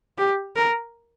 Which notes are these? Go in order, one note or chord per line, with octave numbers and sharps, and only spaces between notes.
G4
A#4